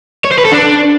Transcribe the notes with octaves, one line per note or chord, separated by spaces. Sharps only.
C#5
C5
B4
A4
D4